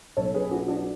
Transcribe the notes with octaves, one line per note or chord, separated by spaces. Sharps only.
B1 B2 A4 C#5
G#4 B4
F#4 A4
D4 F#4